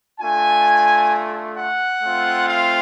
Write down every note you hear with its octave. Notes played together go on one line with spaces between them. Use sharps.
A3 D4 F4 G#5
F#5
A3 C4 F4
F5